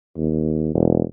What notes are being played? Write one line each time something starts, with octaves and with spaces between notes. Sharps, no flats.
D#2
E1